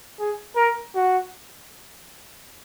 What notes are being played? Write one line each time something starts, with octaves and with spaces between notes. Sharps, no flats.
G#4
A#4
F#4